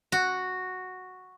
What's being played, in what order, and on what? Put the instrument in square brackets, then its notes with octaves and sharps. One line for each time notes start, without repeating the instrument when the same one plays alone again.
[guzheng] F#4